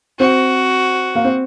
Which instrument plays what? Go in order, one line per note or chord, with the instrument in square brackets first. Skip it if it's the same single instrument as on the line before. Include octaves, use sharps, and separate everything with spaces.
[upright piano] C4 [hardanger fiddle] F#4
[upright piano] A#3
C4